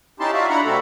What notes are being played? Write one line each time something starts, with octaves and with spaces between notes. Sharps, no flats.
C#4 D#4 E4 G4 A5 C6
F4 F#4 D5 E5 F5
D4 E4 F#5 A#5 B5
C3 G3 A3 C4 F#4 A4